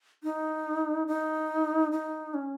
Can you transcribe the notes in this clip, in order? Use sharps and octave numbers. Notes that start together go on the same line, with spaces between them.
D#4
D#4
D#4
C#4